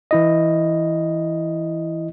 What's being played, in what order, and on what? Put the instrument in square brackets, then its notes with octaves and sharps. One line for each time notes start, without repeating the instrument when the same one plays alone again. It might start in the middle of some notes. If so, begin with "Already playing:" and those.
[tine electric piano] E3 E4 D#5